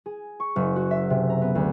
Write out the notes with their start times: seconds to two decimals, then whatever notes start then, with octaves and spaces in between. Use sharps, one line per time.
0.06 G#4
0.40 C#6
0.56 F#1
0.76 F#4
0.91 E5
1.10 C3
1.30 A#5
1.42 B3
1.55 D2